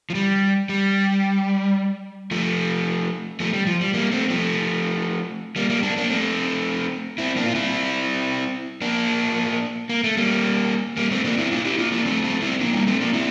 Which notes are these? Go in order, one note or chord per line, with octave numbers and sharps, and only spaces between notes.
F3
G3
G3
F3 A3
F3 A3
G3
F3
G3
G3 A#3
A3 C4
F3 A3
G3 A#3
G3 A#3
A#3 D4
A#3 D4
A3 C4
C4 E4
A#3 D4
F4
C4 E4
A#3 D4
A#3
A3
G3 A#3
G3 A#3
A3 C4
A#3 D4
C4 E4
D4 F4
E4 G4
D4 F4
A#3 D4
A3 C4
A3 C4
C4 E4
A#3 D4
G3 A#3
A3 C4
A#3 D4
C4 E4